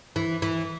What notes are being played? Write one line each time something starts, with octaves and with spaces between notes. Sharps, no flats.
E3
E3